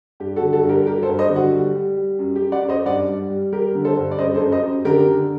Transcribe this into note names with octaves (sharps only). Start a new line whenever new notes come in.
G2 G4
F#4 A4
D3
F#4 A4
G2
G4 A#4
F#3 G4 A#4
A4 C5
G2
C5 D#5
D3
F#4
G3
G3
G3
F#2
G4
F#2
D5 F#5
F#2
C5 D#5
G2 D5 F#5
G3
G3
G3 G4 A#4
D3
A4 C5
G2
D5
F#2 C5 D#5
A4 C5
F#2
C5 D#5
F#2
D3 G4 A#4
D3